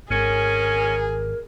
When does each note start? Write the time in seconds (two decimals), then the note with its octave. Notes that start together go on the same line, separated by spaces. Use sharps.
0.10 G#1 F#3 C#4 G#4 A#4